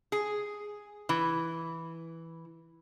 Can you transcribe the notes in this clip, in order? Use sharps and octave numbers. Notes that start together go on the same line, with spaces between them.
G#4
E3